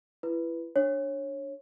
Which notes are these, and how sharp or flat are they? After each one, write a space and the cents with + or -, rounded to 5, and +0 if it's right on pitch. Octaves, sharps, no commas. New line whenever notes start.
E4 +25 B4 +0
D4 +0 C#5 -20